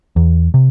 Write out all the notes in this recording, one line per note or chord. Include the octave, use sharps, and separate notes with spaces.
E2
C3